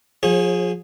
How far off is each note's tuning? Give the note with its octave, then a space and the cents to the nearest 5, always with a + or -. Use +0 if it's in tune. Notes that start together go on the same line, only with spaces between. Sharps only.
F3 +35 G#4 +0 C#5 -40